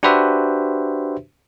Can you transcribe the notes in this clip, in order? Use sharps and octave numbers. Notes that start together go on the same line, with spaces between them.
D4 F#4 G4 B4 C5 E5